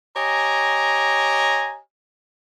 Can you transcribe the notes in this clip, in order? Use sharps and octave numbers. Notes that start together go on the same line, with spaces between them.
G4 C#5 D#5 G#5 A#5